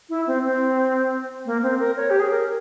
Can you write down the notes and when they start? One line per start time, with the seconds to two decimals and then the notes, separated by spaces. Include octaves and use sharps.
0.09 E4
0.27 C4
0.45 C4
1.46 A#3
1.63 C4
1.79 A#4
1.97 C#5
2.10 G4
2.20 G#4
2.30 A#4